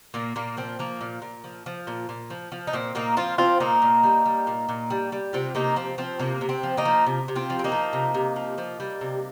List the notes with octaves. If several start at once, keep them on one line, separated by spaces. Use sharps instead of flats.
A#2 A#3
A#2 A#3
F3 C4
F3 A#3
A#2
A#2
F3
F3
A#2
A#2
F3
F3
D#4
A#2 C4
A#2 A#3 D#4
F3 C4 F4
F3 C4 F4
A#2 A#3 D#4
A#2
G3
G3
A#2
A#2
G3
G3
C3 C4 F4
C3 A#3 D#4
F3 C4
F3 C4
C3 A#3
C3
C4
F3
A#3 D#4
F3
C3
C3
C4 F4
F3
C4
A#3 D#4
F3
C3
C3
F3
F3
G3
C3